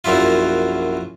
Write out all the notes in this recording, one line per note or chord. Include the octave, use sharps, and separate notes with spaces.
A#1 F#2 F#3 E4 F4